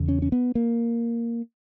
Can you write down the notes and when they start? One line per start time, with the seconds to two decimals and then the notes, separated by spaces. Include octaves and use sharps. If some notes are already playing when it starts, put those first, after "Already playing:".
Already playing: E2 C#3
0.09 C#4
0.22 C#4
0.32 B3
0.55 A#3